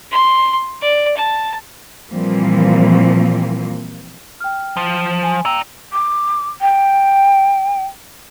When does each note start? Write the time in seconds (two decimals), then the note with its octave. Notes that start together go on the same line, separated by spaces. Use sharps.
0.12 C6
0.82 D5
1.17 A5
2.10 A#2 E3 F3 G3 A#3 C4
4.40 G5 F6
4.77 F3
5.23 G#5
5.45 D5 G5 A#5 E6
5.93 D6
6.62 G5